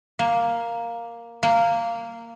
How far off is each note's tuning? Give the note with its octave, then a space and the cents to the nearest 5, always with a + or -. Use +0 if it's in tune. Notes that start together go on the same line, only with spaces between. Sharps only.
A#3 +5
A#3 -10